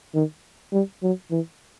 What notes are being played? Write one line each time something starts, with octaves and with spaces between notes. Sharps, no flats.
D#3
G3
F#3
E3